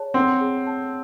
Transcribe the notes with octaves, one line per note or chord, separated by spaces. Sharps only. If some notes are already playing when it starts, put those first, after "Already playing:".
Already playing: G#4 C#5 A5
C4 F#5
G#4
A5